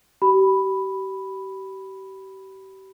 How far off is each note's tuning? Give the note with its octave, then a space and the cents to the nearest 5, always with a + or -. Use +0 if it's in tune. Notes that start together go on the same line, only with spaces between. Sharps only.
G4 -35 B5 +0